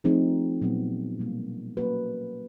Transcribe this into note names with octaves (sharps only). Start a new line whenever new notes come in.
F3 A3 C4 D#4 G#4
A#2 F#3 B3
B2 G3 A#3
F#3 A#3 C#4 F#4 B4